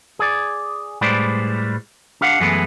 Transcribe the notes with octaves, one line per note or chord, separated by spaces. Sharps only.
G#4 D5
A2 G3 G#3 B4 C5 D5
D4 G4 F5 F#5
F#2 E3 G#3 A3 B3 E4